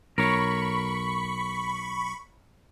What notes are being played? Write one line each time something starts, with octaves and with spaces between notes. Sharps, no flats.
B1 A#4 C#5 B5 C#6